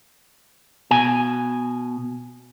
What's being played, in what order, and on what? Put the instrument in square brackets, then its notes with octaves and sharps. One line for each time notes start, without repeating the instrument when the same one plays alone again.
[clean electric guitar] B2 G#5